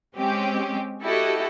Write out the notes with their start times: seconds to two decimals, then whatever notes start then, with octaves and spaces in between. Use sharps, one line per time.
0.16 G#3 C4 C#4 G4
1.02 E4 F#4 G4 A4 D#5